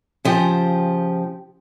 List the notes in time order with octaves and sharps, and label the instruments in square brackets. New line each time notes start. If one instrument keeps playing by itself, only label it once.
[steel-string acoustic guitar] C#3 F3 G4